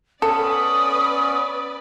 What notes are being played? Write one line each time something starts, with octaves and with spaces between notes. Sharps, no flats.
B3 C#4 A4 B4 D5 D#6